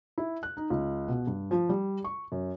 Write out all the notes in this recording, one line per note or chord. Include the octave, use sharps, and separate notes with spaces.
E4
F#6
D#4
C#2
B2
G2
F3
G3
C#6
F#2